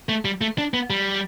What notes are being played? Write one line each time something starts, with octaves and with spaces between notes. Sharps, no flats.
A3
G3
A3
D4
B3
G3